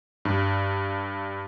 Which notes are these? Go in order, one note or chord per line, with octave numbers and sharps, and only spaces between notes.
G2